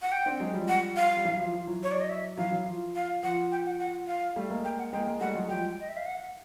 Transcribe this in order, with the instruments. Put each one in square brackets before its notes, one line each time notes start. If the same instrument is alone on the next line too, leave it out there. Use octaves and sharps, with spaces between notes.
[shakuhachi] F#5
G5
[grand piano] C4 D4
F#3 G#3
F3 G3
[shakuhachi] F#5
F5
[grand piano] G3
E3 F#3
F3
F3
E3 F#3
[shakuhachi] C#5
D5
D#5
E5
[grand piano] E3 F#3 [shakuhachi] F5
[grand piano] E3
F3
[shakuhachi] F5
[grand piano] F3 [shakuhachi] F#5
[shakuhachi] G5
F#5
F#5
F5
[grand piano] G3 A3
G#3 A#3
[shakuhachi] G5
F#5
[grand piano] G#3 A#3 [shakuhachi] G5
[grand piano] G#3 A#3
[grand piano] G3 A3 [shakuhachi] F#5
[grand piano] F#3 G#3
[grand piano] F3 G3 [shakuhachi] G5
[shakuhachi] D#5
E5
F5
F#5